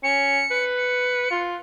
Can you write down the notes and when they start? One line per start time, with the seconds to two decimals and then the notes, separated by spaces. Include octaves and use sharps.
0.03 C#4 C#7
0.51 B4
0.77 C#7
1.31 F4